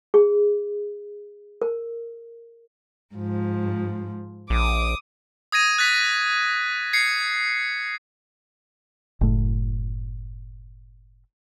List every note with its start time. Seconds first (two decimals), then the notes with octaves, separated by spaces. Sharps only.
0.14 G#4
1.62 A#4
3.15 G#2 F3
4.50 A#1 D6 D#6
5.52 D#6 G#6 A#6 D#7
5.78 F#6 A6 B6
6.93 G#6 C7 C#7
9.21 F#1 A2